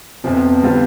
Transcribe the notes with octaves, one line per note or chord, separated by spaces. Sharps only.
F1 F2 C3 F3 B3
D3 G3 C4 F4